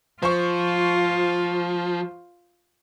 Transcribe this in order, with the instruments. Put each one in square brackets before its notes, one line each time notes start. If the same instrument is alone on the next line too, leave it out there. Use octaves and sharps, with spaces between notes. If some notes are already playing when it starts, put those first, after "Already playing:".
[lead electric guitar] F3 [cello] F4 [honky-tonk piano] C5 C#6